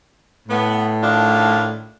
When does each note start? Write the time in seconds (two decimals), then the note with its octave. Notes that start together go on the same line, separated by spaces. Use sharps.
0.48 A2 B3
1.02 D#3 D4 F4